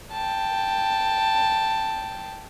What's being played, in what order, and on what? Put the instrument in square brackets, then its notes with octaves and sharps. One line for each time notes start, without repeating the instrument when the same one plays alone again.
[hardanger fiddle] G5 A5